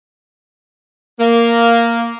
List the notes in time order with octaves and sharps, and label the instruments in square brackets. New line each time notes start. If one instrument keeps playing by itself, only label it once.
[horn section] A#3